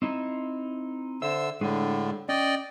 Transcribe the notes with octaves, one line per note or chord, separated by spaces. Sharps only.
C4 D#4 E4
D3 C5 E5 E6
A2 D3 G#3 D4 G#4
C#4 D5 D#5 G5